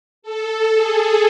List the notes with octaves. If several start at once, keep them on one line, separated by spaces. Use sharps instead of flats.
A4
G#4